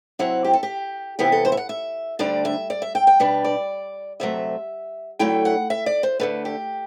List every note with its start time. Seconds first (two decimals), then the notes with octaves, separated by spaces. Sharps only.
0.19 C3 F#3 C4 E4 F#5
0.45 G4
0.53 A4
0.63 G4
1.19 C3 E3 B3 E4 G4
1.32 A4
1.45 C5
1.52 E5
1.57 F#5
1.69 E5
2.19 D2 D3 G3 D4 D5
2.45 E5
2.70 D5
2.82 E5
2.95 G5
3.07 G5
3.20 B2 G3 D4 B4
3.44 D5
4.20 D2 C3 F#3 A3 E5
5.19 D3 F#3 A3 E4 G5
5.45 F#5
5.70 E5
5.86 D5
6.03 C5
6.20 D2 D3 A3 B4
6.45 G4